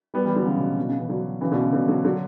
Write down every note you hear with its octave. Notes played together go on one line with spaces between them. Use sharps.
G3 B3
E3 G3
D3 F#3
C#3 E3
B2
B2
C#3
C#3 E3
D3 F#3
C#3 E3
B2 D3
C#3
B2 D3
D3 F#3
D3 F#3